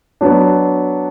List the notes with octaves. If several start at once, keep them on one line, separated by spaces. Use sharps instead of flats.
F#3 B3 D4